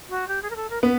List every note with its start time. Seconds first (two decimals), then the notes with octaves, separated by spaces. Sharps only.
0.09 F#4
0.28 G4
0.42 G#4
0.50 A#4
0.56 A4
0.70 A#4
0.82 B3 B4